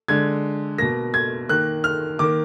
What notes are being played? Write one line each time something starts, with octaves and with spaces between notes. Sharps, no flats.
D3 G#3 G#6
B2 A#3 A#6
G#6
D#3 A#3 F#6
F6
D#3 A#3 D6